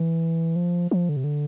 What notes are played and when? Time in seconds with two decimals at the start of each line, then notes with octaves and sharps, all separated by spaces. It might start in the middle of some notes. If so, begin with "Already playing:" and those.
Already playing: E3
0.56 F3
0.91 F3
1.09 D3
1.17 C3
1.24 D3